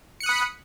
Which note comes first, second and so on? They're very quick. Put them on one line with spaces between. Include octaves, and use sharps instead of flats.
C#7 F#6 D#6 B5